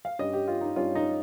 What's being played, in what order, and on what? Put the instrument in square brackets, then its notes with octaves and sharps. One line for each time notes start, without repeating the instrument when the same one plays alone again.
[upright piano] F5
G2 G3 C#4 D#5
G4
F4
D#4
G2 G3 C#4 F4
D#4